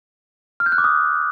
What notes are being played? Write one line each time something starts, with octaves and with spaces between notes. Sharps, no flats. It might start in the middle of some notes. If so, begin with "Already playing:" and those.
F6
G6
F#6
D6
D#6